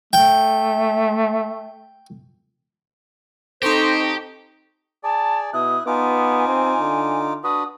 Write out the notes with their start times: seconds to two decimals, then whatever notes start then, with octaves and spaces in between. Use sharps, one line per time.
0.13 A3 G5
3.62 C4 D#4 G4 A4 C5 C#6 A#6
5.03 G#4 D5 A5
5.53 B2 E4 D#6 F#6
5.87 B3 D#4 F4 G#5 D6
6.48 C4
6.79 D3
7.44 D4 F#4 B4 D#6